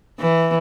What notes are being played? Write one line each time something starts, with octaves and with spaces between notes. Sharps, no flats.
E3